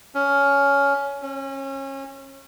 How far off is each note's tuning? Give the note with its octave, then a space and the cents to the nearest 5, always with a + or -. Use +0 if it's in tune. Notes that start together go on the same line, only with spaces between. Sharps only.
C#4 +15
C#4 -30